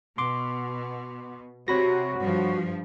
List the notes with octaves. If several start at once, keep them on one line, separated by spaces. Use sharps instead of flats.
B2 C6 D6
C3 F#4 C#5 B5 A#6
G2 F3